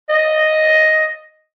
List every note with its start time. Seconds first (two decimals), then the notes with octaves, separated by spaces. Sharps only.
0.09 D#5